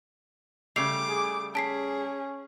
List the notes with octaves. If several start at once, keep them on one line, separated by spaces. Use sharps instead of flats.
C#3 G3 A3 D6 C7 F7
G#4
C#4 G#4 A5 B6 C7